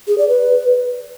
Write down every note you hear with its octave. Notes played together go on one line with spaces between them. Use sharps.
G#4
D5
B4